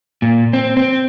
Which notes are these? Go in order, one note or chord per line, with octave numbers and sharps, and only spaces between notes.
A#2
C4
C4